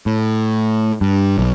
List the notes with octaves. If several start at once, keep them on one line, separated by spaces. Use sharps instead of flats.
A2
G2
B1